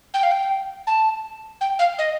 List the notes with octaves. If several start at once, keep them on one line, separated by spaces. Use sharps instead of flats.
G5
F5
G5
A5
G5
F5
D#5